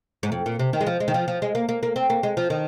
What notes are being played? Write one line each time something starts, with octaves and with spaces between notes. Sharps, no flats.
G#2
F2
A#2
C3
D#3
G#3
F3
G#3
D#3
F3
F3
G#3
A#3
A#3
A#3
C4
A#3
G#3
F3
D#3